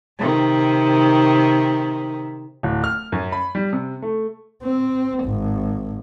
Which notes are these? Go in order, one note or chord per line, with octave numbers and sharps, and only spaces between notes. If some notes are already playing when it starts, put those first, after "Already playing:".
C3 D#3
D1
F6
F#2
B5
G3
C3
A3
C4
G#1